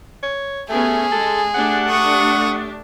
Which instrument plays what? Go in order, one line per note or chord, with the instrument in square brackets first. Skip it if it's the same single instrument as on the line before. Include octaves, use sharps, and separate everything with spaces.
[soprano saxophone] C#5
[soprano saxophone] A3 [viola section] B3 C#4 G4 [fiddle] G#4
[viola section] G#3 [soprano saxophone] A4
[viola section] A3 D4 G4 [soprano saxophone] F#5
[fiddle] C#6 D#6